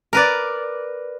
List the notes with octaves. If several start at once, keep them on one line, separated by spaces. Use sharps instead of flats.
A#4 B4 D5